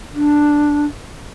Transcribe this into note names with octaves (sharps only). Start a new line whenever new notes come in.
D4